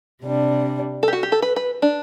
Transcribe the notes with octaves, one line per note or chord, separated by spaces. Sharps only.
C3 G3 D4
A4
G4
F#4
G4
A4
B4
B4
D4